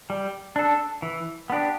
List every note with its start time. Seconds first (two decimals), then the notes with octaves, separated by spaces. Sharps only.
0.10 G3
0.56 D4 A4
1.02 E3
1.50 B3 D4 G4